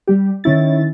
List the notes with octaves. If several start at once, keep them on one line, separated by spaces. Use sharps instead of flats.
G3 G4
D#3 C#4 E4 A6